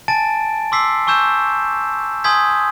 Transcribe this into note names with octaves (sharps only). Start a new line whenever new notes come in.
G#5 A5 A6 D7
C6 D6 E6 B6 C7
G#5 C#6 E6 G6 E7
G#5 C6 D#6 G6 G#6 B6